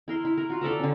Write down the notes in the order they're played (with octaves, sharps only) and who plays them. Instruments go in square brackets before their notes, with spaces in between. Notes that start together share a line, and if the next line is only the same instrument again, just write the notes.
[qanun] E4 A#4 C6
E4
A#4
F4 F#4
A4 D5 E5 A#5
D3 C#4